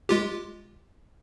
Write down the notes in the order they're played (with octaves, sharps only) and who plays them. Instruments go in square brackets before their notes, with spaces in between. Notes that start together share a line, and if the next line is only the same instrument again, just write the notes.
[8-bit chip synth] G#3 F4 G4